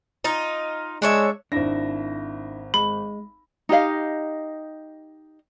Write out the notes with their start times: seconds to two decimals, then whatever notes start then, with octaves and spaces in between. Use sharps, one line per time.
0.24 D#4 F4
1.02 G#3 D4 C#5 E5
1.52 G#1 D4 E4 A#6
2.74 G#3 B5
3.69 D#4 G4 D#5 F5